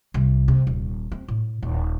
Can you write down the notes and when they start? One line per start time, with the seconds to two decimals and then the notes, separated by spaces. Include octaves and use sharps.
0.14 C2
0.48 C3
0.67 D#1
1.12 C4
1.28 A2
1.63 D#1